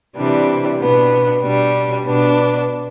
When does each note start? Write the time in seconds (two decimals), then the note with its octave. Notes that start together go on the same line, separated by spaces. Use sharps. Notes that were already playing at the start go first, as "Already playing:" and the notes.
0.16 C3 E3 G3 D4
0.80 B2 B3 D4
1.42 B2 G3 D4
2.05 B2 B3 D4